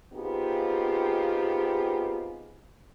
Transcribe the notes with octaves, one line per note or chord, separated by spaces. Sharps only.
B3 C4 D#4 F4 G4 G#4